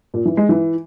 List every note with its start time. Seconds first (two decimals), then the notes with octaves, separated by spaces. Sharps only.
0.14 A#2
0.25 E3
0.37 G#3
0.49 E3